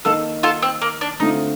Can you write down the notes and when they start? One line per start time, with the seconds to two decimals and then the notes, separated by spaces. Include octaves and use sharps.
0.05 D#3 A#3 D#4 F4 A4
0.43 F4 A4
0.62 C4
0.82 A#3
1.01 D4
1.20 D3 A3 C4 D#4 F4